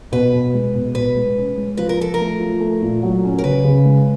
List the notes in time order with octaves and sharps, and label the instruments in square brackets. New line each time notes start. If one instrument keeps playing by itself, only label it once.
[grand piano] B2 [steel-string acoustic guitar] B4
[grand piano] B2
G#3
B2
[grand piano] B2 [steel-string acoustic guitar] B4
[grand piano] G#3
C#4
G#3
[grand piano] F3 [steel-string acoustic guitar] B4
[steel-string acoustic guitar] A#4
[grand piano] F3 [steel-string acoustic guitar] A4
[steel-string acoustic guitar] A#4
[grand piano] A3
F3
A3
A#2
F#3
C#4
[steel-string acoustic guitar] A#4
[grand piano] C#3 [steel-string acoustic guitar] B4
[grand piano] C#3
G#3